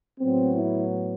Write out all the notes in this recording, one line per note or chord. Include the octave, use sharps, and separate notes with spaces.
A2 F#3 B3 C4
E4